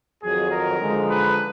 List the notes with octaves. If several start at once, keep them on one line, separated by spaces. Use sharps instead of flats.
F2 D#3 F#3 G#4
A#4
D3 F3 G#3 D#4
B4